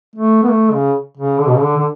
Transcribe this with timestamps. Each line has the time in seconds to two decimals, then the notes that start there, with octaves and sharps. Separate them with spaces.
0.16 A3
0.43 B3
0.50 A3
0.72 C#3
1.17 C#3
1.40 D3
1.47 B2
1.54 C#3
1.61 D3
1.77 D3